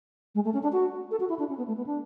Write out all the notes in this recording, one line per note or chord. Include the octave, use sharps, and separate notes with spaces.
G#3
A3
C#4
D4
F#4
A4
F#4
E4
D4
C#4
B3
A3
B3
D4